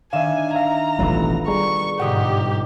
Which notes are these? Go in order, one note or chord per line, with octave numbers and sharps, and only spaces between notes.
D#3 D4 E5 F5 G#5 E7
E5 F5 A#5
E1 A1 F#3 B3 F4 A4
G3 G#4 A#5 C#6
G1 G#2 B2 G4 F#5 D#6